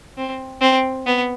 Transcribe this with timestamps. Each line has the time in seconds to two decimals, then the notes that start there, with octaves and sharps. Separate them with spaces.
0.17 C4
0.61 C4
1.06 B3